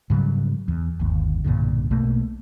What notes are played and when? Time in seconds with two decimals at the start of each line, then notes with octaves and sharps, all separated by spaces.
0.10 G#2 C#3 F#3 G3
0.68 E2
1.00 G1 D#2
1.45 B1 G2 A#2 D3
1.91 B1 B2 A3 A#3